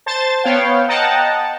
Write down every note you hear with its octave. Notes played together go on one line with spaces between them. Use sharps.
C5 A5 A6
B3 C#5 F5 G5
D#5 F#5 G5 A5 A#5